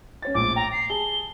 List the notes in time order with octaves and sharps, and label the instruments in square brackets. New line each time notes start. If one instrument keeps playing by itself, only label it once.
[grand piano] C#4 C#5 A6
[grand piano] A#1 A2 [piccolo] D6
[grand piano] G5 [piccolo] A#5
[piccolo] C7
[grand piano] G#4 A5 [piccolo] G7